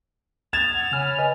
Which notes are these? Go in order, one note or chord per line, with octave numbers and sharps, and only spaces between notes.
D#6 G#6 A6 E7 F7
F#5 E6
C#3 C#5 G#5 B5 F6
B4 D#5 F6